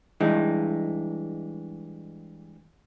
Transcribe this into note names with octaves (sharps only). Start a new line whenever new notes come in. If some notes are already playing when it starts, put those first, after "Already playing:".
G2 E3 G#3 D#4